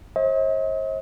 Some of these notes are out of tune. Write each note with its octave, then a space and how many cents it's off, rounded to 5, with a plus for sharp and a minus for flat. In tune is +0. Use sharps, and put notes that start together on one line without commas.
C5 +45 D#5 +45